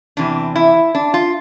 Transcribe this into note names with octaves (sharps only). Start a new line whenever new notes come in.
E2 C3 E3 D4
E4
D4
F4